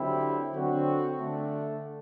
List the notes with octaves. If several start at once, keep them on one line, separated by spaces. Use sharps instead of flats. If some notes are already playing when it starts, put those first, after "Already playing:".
Already playing: D3 F#3 C4 E4 G4
D3 F#3 C4 F#4
D3 A3 D4